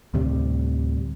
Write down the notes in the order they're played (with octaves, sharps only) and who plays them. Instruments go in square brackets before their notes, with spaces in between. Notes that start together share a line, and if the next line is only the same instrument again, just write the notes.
[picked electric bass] D2 A2 C3 G3